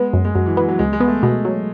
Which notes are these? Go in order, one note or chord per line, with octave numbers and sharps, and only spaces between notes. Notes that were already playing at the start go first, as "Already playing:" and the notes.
Already playing: G#3 B3
F#2
G#3
F#2 F#3
E3
E3 B3
F#3
C#2 G#3
G#3
B3
A3
B2 G#3
F#3